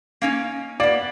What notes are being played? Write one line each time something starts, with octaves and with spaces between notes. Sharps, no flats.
A#3 C#4 D#4
A#3 B3 D5